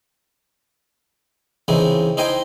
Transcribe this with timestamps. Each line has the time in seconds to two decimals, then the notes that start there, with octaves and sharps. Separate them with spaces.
1.68 C#3 E3 C4 D#4
2.17 D#4 E4 C5 D#5 G5 G#5